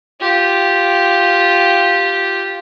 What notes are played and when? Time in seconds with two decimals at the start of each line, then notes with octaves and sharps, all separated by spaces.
0.21 F4 G4